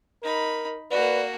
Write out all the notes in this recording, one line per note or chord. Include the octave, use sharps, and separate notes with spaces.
D#4 A#4 B5
A#3 F#4 B4 D5